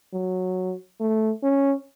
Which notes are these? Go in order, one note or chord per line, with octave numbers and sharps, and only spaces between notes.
F#3
A3
C#4